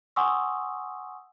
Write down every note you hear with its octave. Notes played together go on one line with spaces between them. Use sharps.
F#5 G#5 C6 C#6 D#6 E6